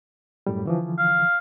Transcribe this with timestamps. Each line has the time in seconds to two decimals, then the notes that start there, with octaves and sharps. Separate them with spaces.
0.47 F#2 A2 G3
0.65 D3 E3 F3
0.98 F5